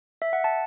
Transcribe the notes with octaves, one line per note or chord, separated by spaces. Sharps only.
E5
F#5
A5